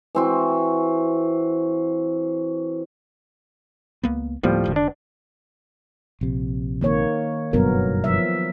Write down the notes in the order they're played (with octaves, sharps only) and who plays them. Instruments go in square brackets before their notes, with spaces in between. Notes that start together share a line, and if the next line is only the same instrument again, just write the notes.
[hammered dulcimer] E3 C4 F#4
[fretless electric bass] C#2 A#3 B3
[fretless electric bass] D2 A#3 B3 [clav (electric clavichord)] A2 F3 G3
[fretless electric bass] F1 G#2 D3
[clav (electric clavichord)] D4
[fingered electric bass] A#1 C3
[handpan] D#3 A#3 C#5
[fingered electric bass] F#1 G2 B2 [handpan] F#3 B3 A#4
[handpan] F3 E5